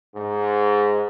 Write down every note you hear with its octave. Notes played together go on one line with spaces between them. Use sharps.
G#2